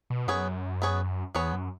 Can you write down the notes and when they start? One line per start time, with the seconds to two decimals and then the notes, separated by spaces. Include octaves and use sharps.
0.10 B2
0.27 F#2 B3 G#4 C#5
0.82 B3 G#4 C#5
1.35 E2 B3 G#4 C#5
1.53 F#2